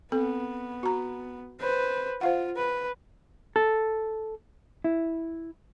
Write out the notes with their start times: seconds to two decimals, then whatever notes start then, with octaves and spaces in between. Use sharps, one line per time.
0.12 B3 C4 A4
0.83 F#4 A#5
1.60 B4 C5
2.21 F4 C5 F5 F#5
2.56 B4
3.56 A4
4.84 E4